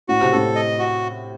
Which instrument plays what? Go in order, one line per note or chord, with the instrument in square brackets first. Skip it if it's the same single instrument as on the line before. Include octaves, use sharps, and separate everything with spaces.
[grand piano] A2 [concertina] F#4
[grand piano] C3
[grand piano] A2 [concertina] A4
[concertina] D#5
F#4